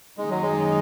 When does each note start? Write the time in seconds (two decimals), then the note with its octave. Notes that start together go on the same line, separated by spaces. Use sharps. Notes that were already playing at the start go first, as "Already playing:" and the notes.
0.18 F#2 D#3 G#3 A#3 D#4
0.30 F#3
0.42 G#3